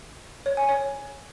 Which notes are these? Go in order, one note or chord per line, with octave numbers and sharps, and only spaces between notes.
C#5
G#5
C#5